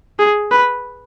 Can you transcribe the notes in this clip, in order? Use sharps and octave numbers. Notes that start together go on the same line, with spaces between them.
G#4
B4